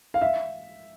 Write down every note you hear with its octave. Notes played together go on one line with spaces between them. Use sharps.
F5
E5